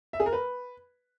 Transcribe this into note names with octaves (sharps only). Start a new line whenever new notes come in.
E5
G#4
A#4
B4